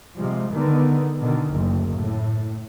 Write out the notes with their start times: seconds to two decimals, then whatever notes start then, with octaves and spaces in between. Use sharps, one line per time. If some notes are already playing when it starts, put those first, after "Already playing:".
0.18 C3 F3 G3 G#3
0.51 D3 D#3 B3
1.19 B2 D3 D#3
1.50 F#1 D2
1.94 A2